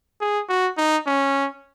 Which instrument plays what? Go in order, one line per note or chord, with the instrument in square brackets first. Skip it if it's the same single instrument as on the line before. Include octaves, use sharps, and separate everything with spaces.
[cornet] G#4
F#4
D#4
C#4